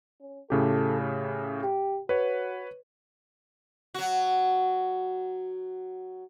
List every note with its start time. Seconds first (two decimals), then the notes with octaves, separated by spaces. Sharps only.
0.21 C#4
0.50 A2 C#3 G4 A4
1.00 C#4
1.62 G4
2.09 F#4 B4 C#5
3.94 F#3 F#4